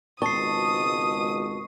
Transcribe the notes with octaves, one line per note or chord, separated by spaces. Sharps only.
G#1 C#2 B2 A5 C#6 D#6 C7